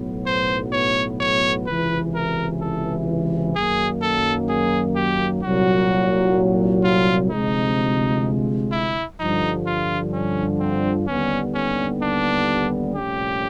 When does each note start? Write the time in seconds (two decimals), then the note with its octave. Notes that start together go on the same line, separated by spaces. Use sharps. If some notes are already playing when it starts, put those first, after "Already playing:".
Already playing: B1 A2 F#3 B3
0.26 C5
0.72 C#5
1.20 C#5
1.67 C#2 C3 E3 B4
2.15 A#4
2.61 A4
3.56 F#2 D#3 F#3 A#3 G#4
4.02 A4
4.49 G#4
4.96 G4
5.43 C2 A#2 F#3 F#4
6.84 F4
7.31 D2 C3 F3 G#3 D#4
8.72 E4
9.19 G2 D3 F3 D#4
9.66 F4
10.13 C#4
10.60 C4
11.07 D#2 D3 G3 B3 C#4
11.54 C#4
12.02 D4
12.96 C2 A#2 F3 A3 C#4 G4